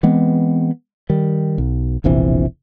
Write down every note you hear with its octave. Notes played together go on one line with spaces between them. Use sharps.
E3 G#3 B3 C4
D#3 G3
B1
E1 A#1 C3 E3